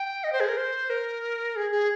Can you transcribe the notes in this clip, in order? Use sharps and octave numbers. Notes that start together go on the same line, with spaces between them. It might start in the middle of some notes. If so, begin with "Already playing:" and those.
Already playing: G5
D#5
C5
G#4
A#4
C5
A#4
G#4
G#4